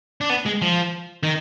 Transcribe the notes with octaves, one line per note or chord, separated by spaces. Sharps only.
D4
B3
G#3
F3
D#3